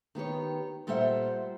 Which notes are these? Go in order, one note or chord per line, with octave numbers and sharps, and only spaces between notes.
D#3 B3 G4 C#5
A#2 G3 A4 C5 E5 F#5